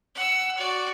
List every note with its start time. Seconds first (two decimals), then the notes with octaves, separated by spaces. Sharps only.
0.15 F#5 E6
0.57 F#4 D5